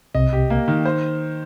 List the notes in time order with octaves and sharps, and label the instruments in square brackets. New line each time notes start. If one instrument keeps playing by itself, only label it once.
[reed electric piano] C2 C3 [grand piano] D#5
[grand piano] G4
A#3
D#3
C5